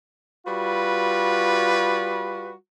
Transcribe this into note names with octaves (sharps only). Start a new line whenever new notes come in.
G3 F4 F#4 B4